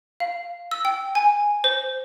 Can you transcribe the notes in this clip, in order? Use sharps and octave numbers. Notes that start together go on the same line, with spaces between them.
F5
E6
G5
G#5
C5